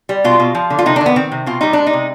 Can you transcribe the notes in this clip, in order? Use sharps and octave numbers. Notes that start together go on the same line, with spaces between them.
G3
B2 F4
B2
F3
D3
F4
C3 D#4
D4
D#3
B3
D#3 C4
C3
B2 F4
G3 D#4
G#3 D4
D#4
C3